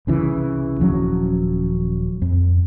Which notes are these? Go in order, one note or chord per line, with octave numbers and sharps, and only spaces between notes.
C2 C#3 E3
D#1 F3 F#3 C#4
F2